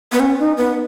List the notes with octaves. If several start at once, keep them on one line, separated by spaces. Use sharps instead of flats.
B3
C#4
D#4
B3